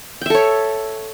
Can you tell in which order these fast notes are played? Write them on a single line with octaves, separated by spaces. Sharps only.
G5 E5 A4 C#5